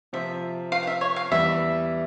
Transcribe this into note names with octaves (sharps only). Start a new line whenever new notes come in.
C3 F3 C4 F4 E5
F5
F5
E5
C#5
F5
E2 E3 G3 E5